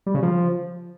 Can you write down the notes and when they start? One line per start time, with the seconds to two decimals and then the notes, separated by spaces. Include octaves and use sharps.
0.06 G3
0.14 C#3
0.23 F3